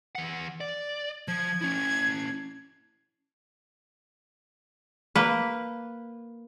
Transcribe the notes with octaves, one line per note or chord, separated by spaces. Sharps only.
E3 F#5
D5
F3 G#6
C#4 E4
A#3 B4